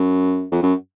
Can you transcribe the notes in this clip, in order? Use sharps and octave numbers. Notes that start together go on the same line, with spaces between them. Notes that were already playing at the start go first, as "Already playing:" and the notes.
Already playing: F#2
F2
F#2